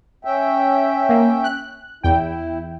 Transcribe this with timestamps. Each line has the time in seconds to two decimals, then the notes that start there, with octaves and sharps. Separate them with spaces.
0.25 C#4 E5 G5
1.09 A#3
1.44 F#6
2.04 E2 E4 G5